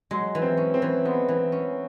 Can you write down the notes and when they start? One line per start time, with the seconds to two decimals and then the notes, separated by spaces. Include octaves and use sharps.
0.11 F#3 G#3
0.35 E3
0.42 C4
0.57 C#4
0.74 C4
0.82 E3
1.05 G#3 B3
1.29 E3
1.52 C#4